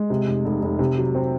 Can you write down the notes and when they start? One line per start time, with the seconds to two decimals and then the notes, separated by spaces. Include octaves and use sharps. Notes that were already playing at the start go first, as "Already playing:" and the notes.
Already playing: G#3
0.10 C3
0.27 F1
0.45 F1
0.62 F1
0.79 C3
0.97 F#3
1.15 C4